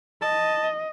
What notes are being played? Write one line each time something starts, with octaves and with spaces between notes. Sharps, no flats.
D#5 A5